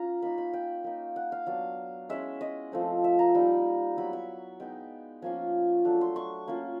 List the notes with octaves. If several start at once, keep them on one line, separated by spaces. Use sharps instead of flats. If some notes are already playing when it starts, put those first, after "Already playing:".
Already playing: C#4 F4 A#5
A#3 D#4 B5
B5
G5
A#3 D#4
F#5
F5
F#3 B3 D4 F5
G#3 C#4 E4 E5
D#5
F3 A3 C4
E5
A#5
G3 A#3 D#4
F#3 B3 E4 B5
C#6
G#3 B3 D#4 G5
F3 A#3 C#4 F4 G#5
F#3 A3 D4
C6
C#6
A#3 C#4 F4